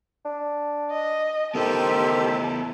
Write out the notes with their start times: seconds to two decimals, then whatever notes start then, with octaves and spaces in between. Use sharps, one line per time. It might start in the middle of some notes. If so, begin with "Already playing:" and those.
0.25 D4
0.91 D#5
1.55 D#3 B3 E4 G4 A4 C5 A5 E6